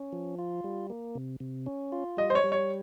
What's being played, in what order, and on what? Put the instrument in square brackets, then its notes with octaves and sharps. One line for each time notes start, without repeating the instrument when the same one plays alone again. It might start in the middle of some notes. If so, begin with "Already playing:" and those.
Already playing: [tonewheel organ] C#4
F3
F4
G3
A#3
C3
C3
C#4
F4
[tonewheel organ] G3 [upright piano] D#5
[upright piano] C5
C#5
[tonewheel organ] G3
[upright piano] C#5